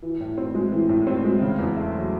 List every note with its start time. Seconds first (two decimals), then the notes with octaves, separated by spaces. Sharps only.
0.02 E3
0.21 A2
0.38 C4
0.55 G#3
0.72 E3
0.89 A2
1.07 C4
1.25 G#3
1.42 C#3
1.59 E2
1.76 A3
1.94 F#3